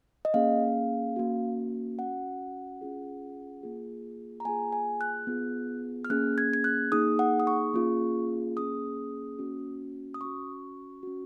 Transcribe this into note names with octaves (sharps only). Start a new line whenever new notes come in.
D#5
A#3 C#4 G#4 F5
A#3 C#4 F#4
C#4 F#4 F#5
C#4 F4 G#4
A#3 F4 G#4
A#5
A#3 F4 G#4 G#5
G#5
F#6
B3 F4 G#4
F6
A#3 C#4 G#4 F#6
G#6
G#6
F#6
A#3 D#4 G#4 D#6
F#5
D#6
C#6
A#3 C#4 F4 G#4
A#3 C#4 G#4 D#6
A#3 C#4 F#4
D#6
C#4 F#4 C#6
C#4 F#4